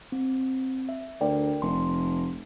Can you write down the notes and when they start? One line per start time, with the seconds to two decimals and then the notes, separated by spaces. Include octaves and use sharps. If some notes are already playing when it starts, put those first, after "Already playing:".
0.12 C4
0.89 E5
1.21 D2 A#4 D5 G5
1.62 F1 C6